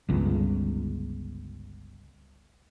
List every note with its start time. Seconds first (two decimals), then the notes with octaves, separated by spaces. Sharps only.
0.09 G1 C#2